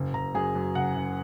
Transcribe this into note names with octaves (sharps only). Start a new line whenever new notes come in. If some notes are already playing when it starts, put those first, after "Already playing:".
Already playing: F#1
F#1 A#5
F#2 G#4
F#2
F#1 F#5
F#1